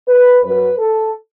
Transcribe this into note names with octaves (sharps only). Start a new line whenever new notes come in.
B4
F#2 F#3 B4
A4